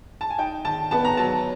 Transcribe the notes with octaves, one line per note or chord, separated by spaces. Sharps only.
A5
G#5
D#4 G5
D#3 A5
B3 A5
A#5
F#3 A5